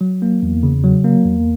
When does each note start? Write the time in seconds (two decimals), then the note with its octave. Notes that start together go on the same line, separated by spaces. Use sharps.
0.01 F#3
0.22 A#3
0.43 E2
0.63 C#3
0.84 F#3
1.04 A#3
1.25 E2